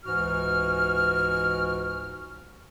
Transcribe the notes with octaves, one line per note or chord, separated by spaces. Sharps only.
C#2 G#2 E3 F#4 F6